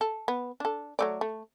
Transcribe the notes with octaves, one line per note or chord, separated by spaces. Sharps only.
A4
B3
D4 A4
F#3 A3 D5
A3